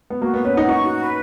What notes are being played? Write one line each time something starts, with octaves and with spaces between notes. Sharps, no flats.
B3
A#3 F#4
B3 B4
C#4
D#4 F#5
D#4 C#6
F#4
B4